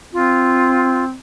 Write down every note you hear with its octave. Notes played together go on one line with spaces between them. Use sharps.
C4 F4